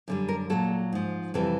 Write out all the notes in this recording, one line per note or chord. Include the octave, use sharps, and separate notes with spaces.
F#2 D3 G3
A#4
A#2 F#3 A4
G#2 F3
F2 C3 E3 G3 A4